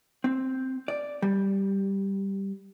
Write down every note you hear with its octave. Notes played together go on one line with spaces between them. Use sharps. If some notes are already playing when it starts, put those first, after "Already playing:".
C4
D5
G3